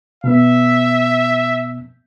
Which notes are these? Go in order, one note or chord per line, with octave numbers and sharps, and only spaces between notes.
B2 B3 E5